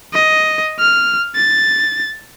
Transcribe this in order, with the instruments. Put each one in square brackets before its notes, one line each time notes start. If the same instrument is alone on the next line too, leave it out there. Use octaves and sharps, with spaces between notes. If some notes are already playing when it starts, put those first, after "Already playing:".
[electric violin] D#5
F6
A6